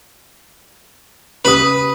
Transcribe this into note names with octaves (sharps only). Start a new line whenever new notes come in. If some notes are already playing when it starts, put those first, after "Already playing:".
C#3 G4 B4 D#6